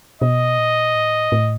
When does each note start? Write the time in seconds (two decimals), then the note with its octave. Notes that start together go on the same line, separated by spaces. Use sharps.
0.22 B2 D#5
0.58 A#2
0.95 A2
1.32 A2